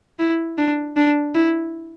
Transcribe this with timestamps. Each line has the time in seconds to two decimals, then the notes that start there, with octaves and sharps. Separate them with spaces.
0.19 E4
0.58 D4
0.97 D4
1.35 E4